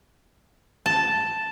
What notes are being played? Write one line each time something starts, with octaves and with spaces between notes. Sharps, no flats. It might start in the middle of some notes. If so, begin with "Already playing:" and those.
A5